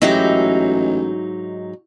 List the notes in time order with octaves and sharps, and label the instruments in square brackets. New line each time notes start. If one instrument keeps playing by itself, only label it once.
[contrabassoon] A1 [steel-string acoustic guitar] G#2 F#3 D#4 [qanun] E4 F#4 G4